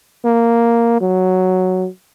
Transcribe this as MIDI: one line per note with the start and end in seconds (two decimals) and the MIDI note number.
0.25 0.97 58
1.01 1.87 54